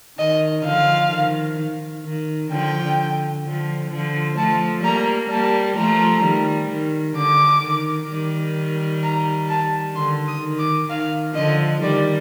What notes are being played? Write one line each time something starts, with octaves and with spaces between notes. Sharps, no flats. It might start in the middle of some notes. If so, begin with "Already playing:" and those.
D#3 D#5
D3 F3 F5
D#3
D#3
D3 F3 G5
D3
D3 F3
D3 F3
F3 A3 A5
G3 A#3 A#5
G3 A#3 A5
F3 A3 A#5
D#3 G3
D#3
D3 D6
D#3
D#3 G3
A#5
A5
D3 C6
D#6
D#3
D6
D#3 F5
D3 F3 D#5
D#3 G3 D5